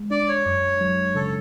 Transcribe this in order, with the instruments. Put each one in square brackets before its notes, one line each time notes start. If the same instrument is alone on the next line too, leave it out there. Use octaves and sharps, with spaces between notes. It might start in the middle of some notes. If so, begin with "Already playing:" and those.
Already playing: [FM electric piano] G#3
[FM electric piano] D4 [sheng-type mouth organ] D5
[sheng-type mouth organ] C#5
[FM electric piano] F#2
F#3
[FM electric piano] C#3 [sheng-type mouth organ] A4